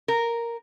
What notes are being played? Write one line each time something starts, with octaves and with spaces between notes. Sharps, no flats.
A#4